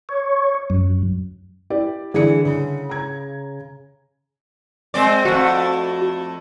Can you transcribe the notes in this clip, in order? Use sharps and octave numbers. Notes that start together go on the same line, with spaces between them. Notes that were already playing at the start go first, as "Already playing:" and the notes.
C#5
F#2
E4 G4 D5
D3 E3 E4 G#4 D5 C#7
C#3
A#5 G#6
G#3 C4 D5
F2 A3 F#4